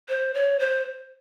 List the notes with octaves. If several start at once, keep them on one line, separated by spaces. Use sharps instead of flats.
C5
C#5
C5